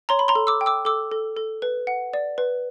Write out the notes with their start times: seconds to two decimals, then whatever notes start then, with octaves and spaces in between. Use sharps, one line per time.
0.09 C#5 A#5 C6
0.19 B5
0.28 A#5 C6
0.35 A4
0.47 D6 E6
0.61 G5
0.66 D6 E6
0.85 A4 D6 E6
1.12 A4
1.37 A4
1.62 B4
1.87 F#5
2.13 D5
2.38 B4